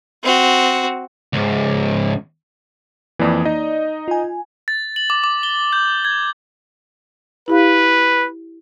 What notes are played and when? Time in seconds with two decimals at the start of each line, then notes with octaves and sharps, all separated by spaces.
0.23 C4 F#4
1.33 C#2 G#2
3.19 F2 E3 A#3 D5 D#6
3.45 D#4 D#5
4.08 F4 G#5
4.68 A6
4.96 F#7
5.10 D6
5.24 D6
5.43 G7
5.73 G6
6.05 G#6
7.48 E4 G4 B4 F5